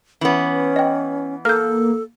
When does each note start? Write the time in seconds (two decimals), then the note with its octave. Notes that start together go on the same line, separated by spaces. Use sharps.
0.21 E3 B3 C#4
0.76 D#5 G5
1.45 A#3 A4 F6 G6